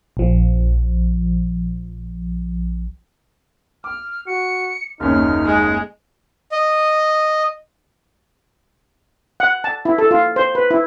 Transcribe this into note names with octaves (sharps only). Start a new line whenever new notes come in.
A#1 F3
D6 F6
F#4 C#7
F#1 D#2 C#4 D#4 F6
G#3
D#5
F#5
A5
E4
A4
F4
C5
B4
E4